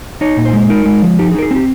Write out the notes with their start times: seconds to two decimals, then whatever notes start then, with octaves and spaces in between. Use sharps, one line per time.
0.21 D#4 C#5
0.37 A#2
0.45 C5
0.53 G#3
0.70 D#4 A#4
0.86 G#3
1.02 F3
1.19 D#4 G4
1.31 G#4
1.35 D#4 A#4
1.42 G#4
1.51 C4 G4